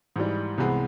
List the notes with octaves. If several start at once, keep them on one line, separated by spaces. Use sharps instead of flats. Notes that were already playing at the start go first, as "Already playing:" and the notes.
G#2 E3 G3
C2 C3 E3 G#3 B3